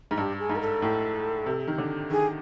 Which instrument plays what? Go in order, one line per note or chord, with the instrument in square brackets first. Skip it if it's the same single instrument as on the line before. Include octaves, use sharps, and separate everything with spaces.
[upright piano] G#2
[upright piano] G2 [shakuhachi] G4
[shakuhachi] G#4
[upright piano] G#2
[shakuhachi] A#4
A4
[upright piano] A2
C3
D#3
D3
[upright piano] D#3 [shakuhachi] G#4